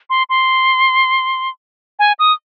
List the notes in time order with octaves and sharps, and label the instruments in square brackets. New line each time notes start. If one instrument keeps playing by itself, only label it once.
[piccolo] C6
C6
G#5
D#6